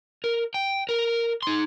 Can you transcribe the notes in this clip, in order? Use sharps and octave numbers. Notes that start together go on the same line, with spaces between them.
A#4
G5
A#4
D#4 C6